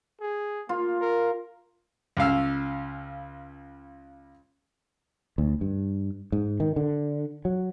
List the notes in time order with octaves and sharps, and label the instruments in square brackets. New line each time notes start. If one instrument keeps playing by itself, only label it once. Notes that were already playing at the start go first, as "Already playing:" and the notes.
[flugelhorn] G#4
[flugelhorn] A#3 [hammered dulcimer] F4
[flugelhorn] A#4
[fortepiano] C#2 C#3 F5 E6
[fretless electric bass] D2
G2
G#2
D#3
D3
F#3